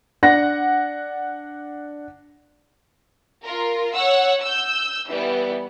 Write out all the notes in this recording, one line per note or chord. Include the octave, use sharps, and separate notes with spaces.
D4 F#5 A#6
F4 A#4
C#5 F#5 E6
E6 G6
E3 G3 B3